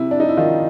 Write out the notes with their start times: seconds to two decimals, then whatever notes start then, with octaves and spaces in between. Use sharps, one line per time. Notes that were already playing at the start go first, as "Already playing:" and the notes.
Already playing: C3 E4
0.11 D4
0.20 D#4
0.29 E4
0.37 D#3 F4